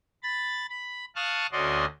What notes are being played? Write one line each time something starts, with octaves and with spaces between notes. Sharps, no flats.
B5 A6
B5
F5 A5 C#6 D#6 F6 F#6
D2 C#4 F#4 D5 D#5 C6